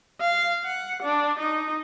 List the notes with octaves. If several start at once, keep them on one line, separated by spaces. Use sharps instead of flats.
F5
F#5
D4
D#4